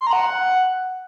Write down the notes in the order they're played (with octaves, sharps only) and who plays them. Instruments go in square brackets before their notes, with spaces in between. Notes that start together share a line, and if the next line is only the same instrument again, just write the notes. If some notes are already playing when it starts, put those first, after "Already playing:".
[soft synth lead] C6
A#5
F#5